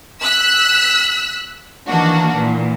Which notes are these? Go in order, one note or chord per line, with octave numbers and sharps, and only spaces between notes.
E6 F#6 B6
D#3 E3 A#3 D4 F#4
A#2 E3